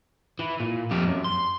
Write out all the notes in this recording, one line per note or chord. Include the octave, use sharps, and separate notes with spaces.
E3
A#2
F2 G4
F#2
C6